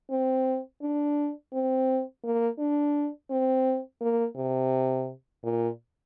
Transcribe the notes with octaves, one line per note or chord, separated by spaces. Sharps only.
C4
D4
C4
A#3
D4
C4
A#3
C3
A#2